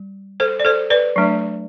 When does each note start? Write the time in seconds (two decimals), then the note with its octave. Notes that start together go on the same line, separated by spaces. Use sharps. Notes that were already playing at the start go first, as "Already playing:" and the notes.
Already playing: G3
0.40 A4 C5
0.60 D5
0.65 A4 C5
0.90 B4 D5
1.16 F#3 A3 D4